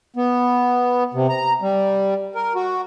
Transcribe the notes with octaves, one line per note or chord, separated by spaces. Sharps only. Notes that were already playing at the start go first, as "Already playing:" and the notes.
B3
C3
A#5
G3
A#4
F#4